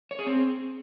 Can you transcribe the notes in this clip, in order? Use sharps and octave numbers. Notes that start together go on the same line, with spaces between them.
C#5
G#4
C4